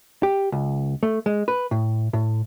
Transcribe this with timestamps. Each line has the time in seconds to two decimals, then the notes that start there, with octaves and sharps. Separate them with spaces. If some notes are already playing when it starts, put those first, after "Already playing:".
0.23 G4
0.52 C#2
1.03 A3
1.26 G#3
1.48 B4
1.71 A2
2.13 A2